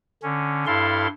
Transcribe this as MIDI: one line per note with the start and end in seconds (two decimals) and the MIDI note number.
0.23 0.65 50
0.23 0.65 61
0.66 1.07 43
0.66 1.07 64
0.66 1.07 69
0.66 1.07 77
0.66 1.07 84